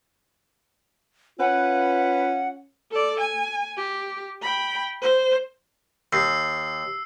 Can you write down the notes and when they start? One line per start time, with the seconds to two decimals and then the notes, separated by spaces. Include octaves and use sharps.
1.40 C#4 F4 B4 F#5
2.91 A4 D5
3.20 G#5
3.77 G4
4.42 G5 B5
5.01 C5
6.13 D#2 E6 C7